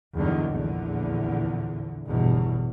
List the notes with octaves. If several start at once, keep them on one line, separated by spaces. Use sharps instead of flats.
E2 G2 D3 D#3 F#3
A#1 E2 D3
G1 E2 B2